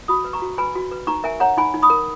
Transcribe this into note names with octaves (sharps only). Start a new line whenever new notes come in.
F#4 B5 D#6
B4
A#5 C#6
F#4
B4 G#5 B5
F#4
B4
D#4 A#5 C#6
A#4 E5 G#5
C#5 F#5 A#5
D#4 G#5 B5
D#4
B5 D#6
A#4